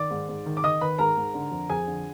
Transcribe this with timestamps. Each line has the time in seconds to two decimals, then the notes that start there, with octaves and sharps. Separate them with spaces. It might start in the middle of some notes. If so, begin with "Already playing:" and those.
Already playing: D#3 D5 D6
0.10 G#2
0.28 G#2
0.46 D#3
0.57 D6
0.64 D#3 D#5 D#6
0.81 D#3 B4 B5
0.98 G#2 A#4 A#5
1.17 G#2
1.34 D3
1.51 F2
1.69 F2 G#4 G#5
1.87 D3